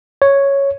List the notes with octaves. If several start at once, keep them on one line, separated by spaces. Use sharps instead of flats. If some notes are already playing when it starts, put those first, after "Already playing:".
C#5